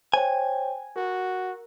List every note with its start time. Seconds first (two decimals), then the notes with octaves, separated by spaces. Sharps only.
0.14 C5 C#5 G5 G#5
0.96 F#4 A#4